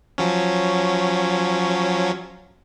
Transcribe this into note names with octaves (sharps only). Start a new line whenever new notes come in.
F3 F#3 C#4